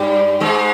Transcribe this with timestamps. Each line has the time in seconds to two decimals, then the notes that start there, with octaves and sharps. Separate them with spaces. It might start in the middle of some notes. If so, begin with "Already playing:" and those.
Already playing: G2 G3
0.40 G#2 G#3